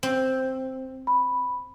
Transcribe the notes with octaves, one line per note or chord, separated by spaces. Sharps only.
C4
B5